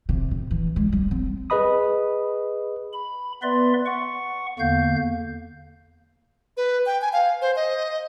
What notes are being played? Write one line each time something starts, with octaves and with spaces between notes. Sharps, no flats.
C3
A2
E3
G#3
G3
C4
G#4 B4 D#5 B5 D#6
B5
B3 B4 D5 E5 C6
F#5 C#6
E2 D3 A#3 F5 G6
B4
G5
G#5
F5
C5
D#5